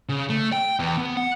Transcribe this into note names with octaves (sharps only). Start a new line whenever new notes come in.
C#3
A3
G5
E2
B3
F#5